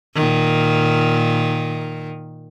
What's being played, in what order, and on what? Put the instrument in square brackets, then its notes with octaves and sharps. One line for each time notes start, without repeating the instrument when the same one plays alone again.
[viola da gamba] A#2 D#3